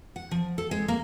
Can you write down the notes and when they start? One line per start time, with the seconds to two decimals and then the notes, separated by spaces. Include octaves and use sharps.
0.16 F#5
0.31 F3
0.58 A4
0.71 G#3
0.88 A#3